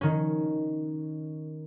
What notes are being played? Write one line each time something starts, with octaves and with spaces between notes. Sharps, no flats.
D#3 C#4